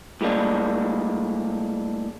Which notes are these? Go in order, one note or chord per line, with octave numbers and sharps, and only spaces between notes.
A2 G3 G#3 A#3 D4